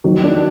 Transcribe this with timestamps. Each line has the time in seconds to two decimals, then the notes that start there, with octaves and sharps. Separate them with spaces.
0.04 D#3 F#3
0.24 D4